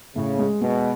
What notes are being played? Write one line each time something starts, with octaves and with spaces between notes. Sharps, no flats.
A2 C#3
G#3
B2 G#3